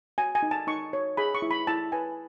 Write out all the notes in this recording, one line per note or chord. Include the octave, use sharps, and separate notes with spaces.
F#4 G#5
G#5
D#4
A5
D#4 C#6
C#5
G#4 B5
C#6
E4
B5
E4 A5
B4 G#5